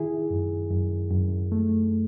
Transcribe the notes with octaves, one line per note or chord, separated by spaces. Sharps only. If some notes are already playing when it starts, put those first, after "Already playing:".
Already playing: D#3 E4 G#4
F#2
F#2
F#2
A3